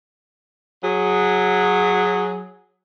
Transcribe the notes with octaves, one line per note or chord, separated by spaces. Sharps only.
F#3 G#4